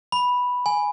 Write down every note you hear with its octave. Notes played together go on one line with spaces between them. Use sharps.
B5
G#5